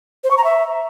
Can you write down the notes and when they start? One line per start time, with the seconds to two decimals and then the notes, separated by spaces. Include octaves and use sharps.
0.23 C5
0.30 C#6
0.37 A#5
0.44 E5